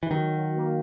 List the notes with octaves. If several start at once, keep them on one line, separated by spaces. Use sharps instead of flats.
E3
D#3 F#3
A#3